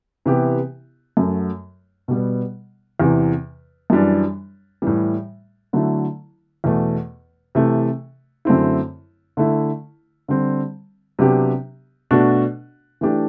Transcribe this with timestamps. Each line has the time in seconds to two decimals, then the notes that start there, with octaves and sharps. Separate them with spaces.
0.26 C3 E3 B3 E4 G4
1.17 F#2 F#3 A3
2.08 B2 G3 B3
3.00 E2 C3 E3
3.90 F#2 E3 G3 D4
4.82 A2 E3 G3
5.73 D3 F#3 A3 E4
6.64 E2 B2 A3
7.55 C3 E3 A3
8.45 F#2 D3 A3 C4 E4
9.37 D3 A3 E4
10.28 D3 G3 C4
11.19 C3 F#3 B3 D4 G4
12.11 B2 A3 D4 F#4
13.01 E3 A3 D4 G4